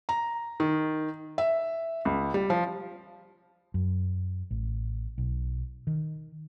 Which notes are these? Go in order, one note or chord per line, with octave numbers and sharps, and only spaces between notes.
A#5
D#3
E5
C#2
G3
F3
F#2
A1
B1
D#3